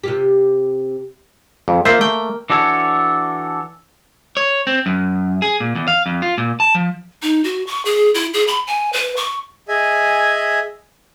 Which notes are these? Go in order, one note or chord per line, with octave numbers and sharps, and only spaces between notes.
C3 F4 G4
F2
A#3 F4 C5 E5 A#5
A3 G5
E3 D4 F#4 A4 C#5
C#5
C4
F#2
G#4
A#2
E2
F5
F2
F4
A#2
A5
F3
D#4
F#4
C#6
G#4
E4
G#4
B5
G#5
B4
C#6
G#4 D#5 E5 G#5